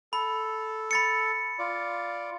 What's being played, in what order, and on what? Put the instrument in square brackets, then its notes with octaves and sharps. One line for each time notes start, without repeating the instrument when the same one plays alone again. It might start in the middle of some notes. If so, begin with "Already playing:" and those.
[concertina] A4 [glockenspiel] B5
[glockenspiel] B5 A6 C#7
[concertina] F4 D5